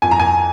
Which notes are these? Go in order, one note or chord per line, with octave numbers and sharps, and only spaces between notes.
F2 G#5
A#5
G#5